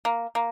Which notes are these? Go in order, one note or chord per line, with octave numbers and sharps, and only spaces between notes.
A#3
A#3